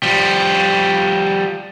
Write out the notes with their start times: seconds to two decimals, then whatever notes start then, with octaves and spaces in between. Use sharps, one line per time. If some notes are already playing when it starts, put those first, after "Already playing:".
0.03 F3 G3